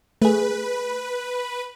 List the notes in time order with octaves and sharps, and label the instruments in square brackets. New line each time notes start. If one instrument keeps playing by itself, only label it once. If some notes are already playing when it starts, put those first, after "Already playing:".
[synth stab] A3 G#4 [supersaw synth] B4